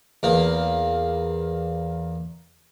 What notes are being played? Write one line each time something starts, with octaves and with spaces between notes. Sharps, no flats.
E2 A#3